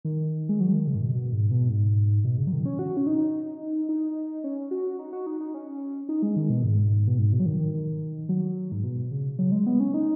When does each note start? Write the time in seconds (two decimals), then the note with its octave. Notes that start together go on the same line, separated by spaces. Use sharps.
0.05 D#3
0.49 G#3
0.60 F#3
0.73 D#3
0.87 C#3
0.95 G#2
1.01 B2
1.14 B2
1.33 G#2
1.51 B2
1.69 G#2
2.25 B2
2.38 C#3
2.47 F#3
2.52 D#3
2.65 C#4
2.79 F#4
2.97 C#4
3.07 D#4
3.89 D#4
4.44 C#4
4.71 F#4
4.99 D#4
5.13 F#4
5.26 D#4
5.40 D#4
5.54 C#4
6.09 D#4
6.23 G#3
6.36 D#3
6.50 B2
6.64 G#2
7.07 B2
7.19 G#2
7.33 B2
7.40 F#3
7.46 D#3
7.60 D#3
7.74 D#3
8.29 F#3
8.72 G#2
8.84 B2
9.12 C#3
9.39 F#3
9.52 G#3
9.66 B3
9.80 C#4
9.94 D#4